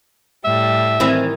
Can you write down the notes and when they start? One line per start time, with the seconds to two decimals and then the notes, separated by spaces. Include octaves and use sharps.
0.44 A2 G3 E5
1.00 D#3 E3 C4 E4 D#5